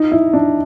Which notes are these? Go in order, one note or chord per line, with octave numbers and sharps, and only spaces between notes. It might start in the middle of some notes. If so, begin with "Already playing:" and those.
Already playing: D#4
E4
D4